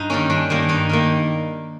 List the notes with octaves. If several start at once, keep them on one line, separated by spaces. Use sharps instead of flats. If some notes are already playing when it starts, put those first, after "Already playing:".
Already playing: G2 D#4
D#3 G3 A#3 C#4
G2 D4
D#3 G3 A#3
G2 D#4
D#3 G3 A#3